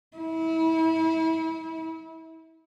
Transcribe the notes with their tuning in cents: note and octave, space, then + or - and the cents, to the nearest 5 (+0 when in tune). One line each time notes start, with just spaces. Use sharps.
E4 -30